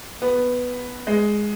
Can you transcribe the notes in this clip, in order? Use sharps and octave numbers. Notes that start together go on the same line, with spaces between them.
B3
G#3